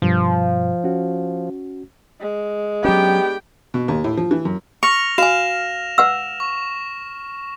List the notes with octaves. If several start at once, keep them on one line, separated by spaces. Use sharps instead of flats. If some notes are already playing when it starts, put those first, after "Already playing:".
G2 B2 F3
C#4 F#4
G#3
F#3 B3 C#4 D4 G4 G5
B2
D#2
A2
F3
E3
F#2
C#6 F6 A#6 F7
F#4 F5 G#5 E7
B4 F#5 E6
C#6